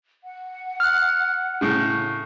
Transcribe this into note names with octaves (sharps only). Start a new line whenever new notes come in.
F#5
F6 F#6
A2 C#3